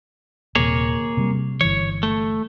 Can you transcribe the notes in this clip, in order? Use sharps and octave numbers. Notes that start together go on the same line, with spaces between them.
D#1 C3 A#3 G#4 C#5
C3 G3
G1 E3 C#5
A3